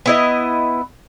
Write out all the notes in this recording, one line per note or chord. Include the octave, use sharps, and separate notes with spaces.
B3 E4 D#5